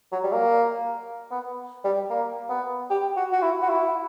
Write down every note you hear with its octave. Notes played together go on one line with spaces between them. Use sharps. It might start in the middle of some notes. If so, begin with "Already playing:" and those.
F#3
G3
A#3
B3
G3
A#3
B3
G4
F#4
F#4
E4
F#4
E4